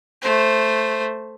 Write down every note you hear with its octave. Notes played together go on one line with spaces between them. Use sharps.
A3 C5